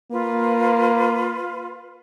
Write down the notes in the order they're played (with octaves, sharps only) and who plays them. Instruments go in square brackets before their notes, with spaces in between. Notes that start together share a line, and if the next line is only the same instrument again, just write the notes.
[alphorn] A#3 [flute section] F4 B4